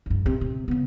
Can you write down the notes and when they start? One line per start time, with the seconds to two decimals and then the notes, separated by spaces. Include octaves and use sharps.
0.06 C2 G2
0.26 C3
0.41 C3
0.68 C#3 B3